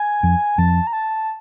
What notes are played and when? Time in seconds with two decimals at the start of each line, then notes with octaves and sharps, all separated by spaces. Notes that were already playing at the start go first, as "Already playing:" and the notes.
Already playing: G#5
0.23 F2 F3
0.58 F2 F3 A5
0.87 A#5
0.93 A5